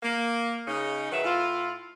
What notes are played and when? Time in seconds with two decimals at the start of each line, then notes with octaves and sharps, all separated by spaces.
0.03 A#3
0.67 C#3 D#4
1.12 D#3 F#3 G#4 B4 E5
1.24 A2 E4 F4